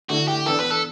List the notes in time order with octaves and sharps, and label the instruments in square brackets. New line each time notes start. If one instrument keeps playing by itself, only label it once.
[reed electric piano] D3 A3 E4 [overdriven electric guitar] F#4
[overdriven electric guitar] G4
[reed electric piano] E3 B3 D4 [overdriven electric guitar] A4
[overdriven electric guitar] B4
A4